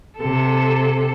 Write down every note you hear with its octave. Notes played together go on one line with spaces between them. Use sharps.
C3 A4